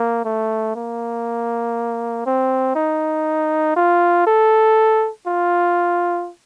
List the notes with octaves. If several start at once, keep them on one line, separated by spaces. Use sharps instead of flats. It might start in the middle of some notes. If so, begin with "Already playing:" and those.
Already playing: A#3
A3
A#3
C4
D#4
F4
A4
F4